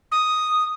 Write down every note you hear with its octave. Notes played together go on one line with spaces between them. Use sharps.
D#6